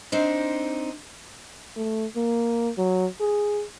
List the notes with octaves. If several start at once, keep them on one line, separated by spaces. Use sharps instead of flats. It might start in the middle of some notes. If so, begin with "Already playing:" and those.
C4 D4 D#4 C5
A3
A#3
F#3
G#4